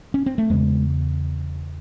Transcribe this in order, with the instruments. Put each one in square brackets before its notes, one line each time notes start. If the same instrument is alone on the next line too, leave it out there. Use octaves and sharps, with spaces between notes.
[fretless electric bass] C#4
C4
A3
E2 C#3 G#3